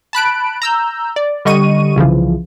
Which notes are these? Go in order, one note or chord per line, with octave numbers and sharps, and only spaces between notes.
A5 B5 F#6 D7
A#5 E6 G6
D5
D3 G3 D#5 C#6 D#7
C2 C#3 E3 F3